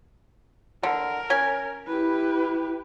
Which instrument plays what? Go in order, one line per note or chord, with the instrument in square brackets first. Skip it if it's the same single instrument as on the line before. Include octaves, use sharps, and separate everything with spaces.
[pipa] D3 [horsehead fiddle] A#4
[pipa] C#4 G#5
[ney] E4 [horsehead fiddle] G4 B4